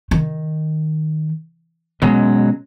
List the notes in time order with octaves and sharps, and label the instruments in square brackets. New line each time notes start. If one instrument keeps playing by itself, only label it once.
[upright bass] D#3
[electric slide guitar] B2 F#3 G#3 [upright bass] C#4